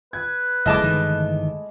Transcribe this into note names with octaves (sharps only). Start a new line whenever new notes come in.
B4 G#6
F#1 F2 G#3 A3 E4 D#5 A5 D6
G1 D#3 E3